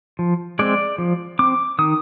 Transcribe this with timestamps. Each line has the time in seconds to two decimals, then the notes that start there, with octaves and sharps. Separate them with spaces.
0.19 F3
0.59 G#3 C4 D5
0.98 F3
1.39 C4 D6
1.79 D#3 D#6